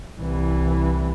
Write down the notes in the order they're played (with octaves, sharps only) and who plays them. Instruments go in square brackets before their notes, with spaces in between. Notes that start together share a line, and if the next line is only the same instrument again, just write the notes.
[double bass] C2 E3